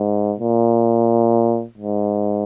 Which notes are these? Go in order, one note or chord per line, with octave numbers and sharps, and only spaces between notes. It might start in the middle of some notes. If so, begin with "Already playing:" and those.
Already playing: G#2
A#2
G#2